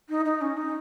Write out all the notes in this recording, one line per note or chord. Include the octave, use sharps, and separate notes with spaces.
D#4
D#4
C#4
D#4